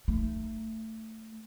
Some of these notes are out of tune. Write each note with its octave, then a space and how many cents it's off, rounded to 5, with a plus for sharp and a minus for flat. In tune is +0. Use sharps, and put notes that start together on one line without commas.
A3 +15 D#4 +0